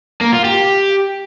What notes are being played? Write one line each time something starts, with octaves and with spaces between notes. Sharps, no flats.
A#3
F4
G4